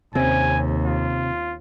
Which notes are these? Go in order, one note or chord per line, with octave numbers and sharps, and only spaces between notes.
D#2 C3 C4 C#4 G#5
F4